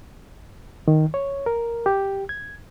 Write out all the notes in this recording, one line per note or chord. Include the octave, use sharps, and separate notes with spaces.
D#3
C#5
A#4
G4
G#6